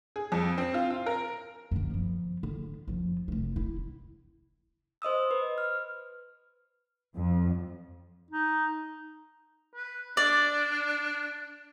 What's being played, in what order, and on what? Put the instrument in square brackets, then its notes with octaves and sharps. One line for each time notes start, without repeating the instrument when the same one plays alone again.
[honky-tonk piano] G#4
F2
C4
F4
F4
A#4
[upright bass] F#2 D3
F3 B3
D3
F#2 F3
F1 A3
E4
[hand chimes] C5 D#5 D#6 E6
B4
F6
[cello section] F2
[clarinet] D#4
[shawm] B4
[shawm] D4 [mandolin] D5